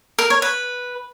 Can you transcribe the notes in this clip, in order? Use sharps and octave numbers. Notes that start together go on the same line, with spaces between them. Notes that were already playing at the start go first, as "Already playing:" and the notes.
A#4
C#5
B4